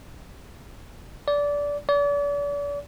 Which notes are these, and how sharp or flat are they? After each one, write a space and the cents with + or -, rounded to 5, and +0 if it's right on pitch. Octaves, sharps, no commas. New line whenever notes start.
D5 -20
D5 -40